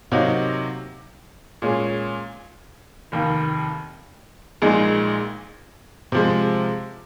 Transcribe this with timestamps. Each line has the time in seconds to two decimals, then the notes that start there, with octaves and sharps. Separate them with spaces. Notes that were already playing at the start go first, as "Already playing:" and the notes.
0.12 C3 F#3 A#3 D#4 F#4
1.62 A#2 G#3 C#4 G#4
3.12 F1 D#2 D#3 A#3
4.62 A#1 A#2 G#3 D#4 G#4
6.12 C3 F3 G#3